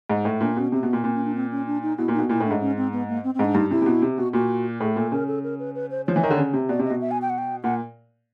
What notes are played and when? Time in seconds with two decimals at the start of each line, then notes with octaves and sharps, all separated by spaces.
0.09 G#2
0.25 A2
0.41 A#2 D4
0.56 B2 C#4
0.72 C3 C4
0.81 B2 A#3
0.88 B3
0.93 A#2
1.03 A#2 C4
1.14 C#4
1.25 D4
1.35 C4
1.51 C#4
1.67 D4
1.82 D#4
1.98 B2 E4
2.08 A#2
2.13 D#4
2.19 B2
2.29 A#2 E4
2.40 A2
2.45 D4
2.51 G#2
2.61 C#4
2.77 C4
2.92 B3
3.08 A#3
3.24 C4
3.34 C4
3.39 G#2
3.44 D4
3.55 G2 D#4
3.71 C3 E4
3.82 C3
3.86 B2
4.02 C3
4.17 B2 F#4
4.33 A#2 F#4
4.80 A2 G#4
4.96 A#2 A4
5.12 C#3 A#4
5.28 A4
5.43 A#4
5.59 B4
5.75 B4
5.90 C5
6.06 F3 C#5
6.16 E3
6.23 D#3
6.31 D3
6.38 C#3
6.54 C3
6.69 B2 D5
6.79 C3
6.85 D#5
6.90 B2
7.01 E5
7.11 G#5
7.22 G5
7.30 F#5
7.38 G5
7.63 A#2 F#5